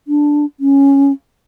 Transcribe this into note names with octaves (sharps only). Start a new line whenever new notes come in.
D4
C#4